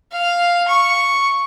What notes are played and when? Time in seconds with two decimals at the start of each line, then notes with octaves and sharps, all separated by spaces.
0.12 F5
0.68 C#6